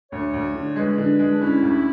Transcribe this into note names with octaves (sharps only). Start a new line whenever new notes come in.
D2 C#5
D2
D3
G#3 B4
D3
G#3
D4
C#4 E4
D2